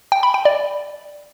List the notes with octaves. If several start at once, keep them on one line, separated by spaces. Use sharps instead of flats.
G5
B5
G5
D5